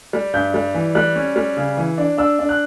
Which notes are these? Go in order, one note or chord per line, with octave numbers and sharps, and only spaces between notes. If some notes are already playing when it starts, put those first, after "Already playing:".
G3
G2 G6
G3
E3
G3 F#6
C#4
G3
C#3
E3
D4
D4 E6
D4
F#6